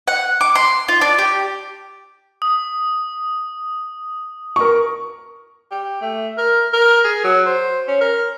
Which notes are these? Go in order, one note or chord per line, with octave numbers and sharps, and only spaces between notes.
F#5
D6
C6
F4
D4
G4
D#6
A#4 C#6
G4
A3
A#4
A#4
G#4
F#3
C5
C#4
A#4